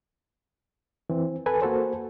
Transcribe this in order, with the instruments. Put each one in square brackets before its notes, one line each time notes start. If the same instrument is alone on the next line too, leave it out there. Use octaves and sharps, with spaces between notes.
[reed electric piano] E3 C4
A4 B4 G#5
A#3 F#4 A4 C5